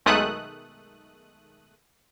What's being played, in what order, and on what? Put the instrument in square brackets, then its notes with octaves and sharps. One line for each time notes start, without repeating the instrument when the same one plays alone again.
[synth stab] B1 D#3 G#3 A3 D#6 F#6